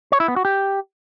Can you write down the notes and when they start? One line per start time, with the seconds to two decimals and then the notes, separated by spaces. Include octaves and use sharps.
0.12 C#5
0.20 E4
0.28 B3
0.36 F#4
0.45 G4